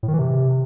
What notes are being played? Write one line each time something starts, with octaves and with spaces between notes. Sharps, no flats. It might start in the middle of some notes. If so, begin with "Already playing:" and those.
A2
D#3
E3
C3